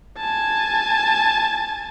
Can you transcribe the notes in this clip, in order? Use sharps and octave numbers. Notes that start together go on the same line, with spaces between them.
G#5 A5